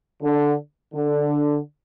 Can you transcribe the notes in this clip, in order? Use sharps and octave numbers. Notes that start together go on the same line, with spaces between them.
D3
D3